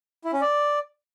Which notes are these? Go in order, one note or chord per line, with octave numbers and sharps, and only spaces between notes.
E4
C#4
D5